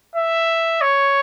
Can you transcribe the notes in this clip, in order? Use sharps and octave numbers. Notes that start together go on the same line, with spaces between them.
E5
C#5